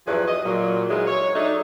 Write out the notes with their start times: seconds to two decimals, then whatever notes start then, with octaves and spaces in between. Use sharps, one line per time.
0.07 E2 G2 F3 F#3 G#4 B4
0.28 D#5
0.45 A#2 F#3
0.90 E3 F#3 G#3 D#4 F4 G#4
1.07 C#5
1.35 F#3 A3 D4 D#4